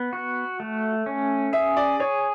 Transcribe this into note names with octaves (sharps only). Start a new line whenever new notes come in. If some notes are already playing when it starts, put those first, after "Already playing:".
Already playing: B3
F#4
A3
C#4
G#4 E5
D5
G#4 C#5